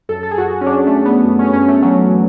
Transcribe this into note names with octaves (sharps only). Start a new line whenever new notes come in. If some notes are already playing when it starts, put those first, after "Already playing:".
F#2 A4
A4
G#4
F#2 F#4
C#4
F#2 D4
A3
F#2
B3
F#2
C#4
F#2 C#4
A3
E3 F#3